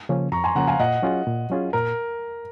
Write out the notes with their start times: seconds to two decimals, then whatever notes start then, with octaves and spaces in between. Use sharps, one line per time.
0.09 C#3 F3 A#3 C#4
0.32 F2 A#5 C#6
0.44 G#5 C6
0.56 C#3 F3 A#3 C#4 F#5 A#5
0.67 F5 G#5
0.80 A#2 D#5 F#5
1.02 F#3 C#4 F4 G#4
1.27 A#2
1.50 F#3 C#4 F4 G#4
1.73 A#2 A#4